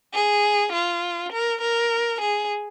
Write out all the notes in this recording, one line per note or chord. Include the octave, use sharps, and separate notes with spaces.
G#4
F4
A#4
A#4
G#4